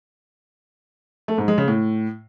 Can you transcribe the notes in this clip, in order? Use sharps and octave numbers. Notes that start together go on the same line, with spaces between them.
A3
G#2
G#3
C#3
A2